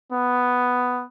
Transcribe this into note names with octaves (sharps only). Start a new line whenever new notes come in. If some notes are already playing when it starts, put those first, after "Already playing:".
B3